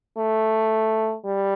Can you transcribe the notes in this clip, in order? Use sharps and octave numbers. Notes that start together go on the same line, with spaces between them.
A3
G3